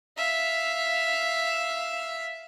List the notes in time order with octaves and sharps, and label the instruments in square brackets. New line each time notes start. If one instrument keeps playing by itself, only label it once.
[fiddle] E5 F5